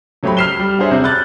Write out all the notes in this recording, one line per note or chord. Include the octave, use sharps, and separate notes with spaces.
C#3 F#3 A3 G4 C5 B5
F6 B6 C7 E7 G7
G3
D4 F#4 G#4 C5 C#5 E5
C3
B5 F#6 G6 A6